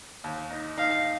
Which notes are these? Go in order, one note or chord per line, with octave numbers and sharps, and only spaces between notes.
D#2
D#4
D#4 F5